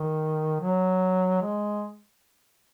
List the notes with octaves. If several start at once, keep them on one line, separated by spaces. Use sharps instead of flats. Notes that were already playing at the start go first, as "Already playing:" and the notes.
Already playing: D#3
F#3
G#3